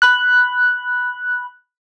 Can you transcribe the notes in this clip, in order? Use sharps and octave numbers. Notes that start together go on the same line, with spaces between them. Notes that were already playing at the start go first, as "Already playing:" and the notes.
B5 F#6